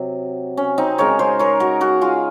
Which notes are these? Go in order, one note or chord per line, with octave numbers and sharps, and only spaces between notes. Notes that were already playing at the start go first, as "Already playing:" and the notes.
Already playing: C3 F#3
C#4
C4 D#4
C#3 G#3 A#4 C#5
G#4 C5
A#4 C#5
F#4 A#4
F#4 A#4
F4 G#4